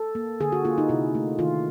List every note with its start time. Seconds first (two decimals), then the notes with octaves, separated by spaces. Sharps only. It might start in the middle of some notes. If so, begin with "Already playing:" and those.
Already playing: A4
0.15 A#3
0.40 D3 G#4
0.52 F#4
0.65 A#3 F4
0.78 D#4
0.89 C3 E4
1.15 A3
1.39 D#3 F4